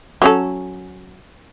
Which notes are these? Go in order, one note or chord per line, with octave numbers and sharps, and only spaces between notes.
F#3 C#4 A4